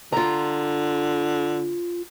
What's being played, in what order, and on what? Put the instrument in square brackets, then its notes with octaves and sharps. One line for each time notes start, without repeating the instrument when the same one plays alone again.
[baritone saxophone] D3 [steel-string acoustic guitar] F4 A#5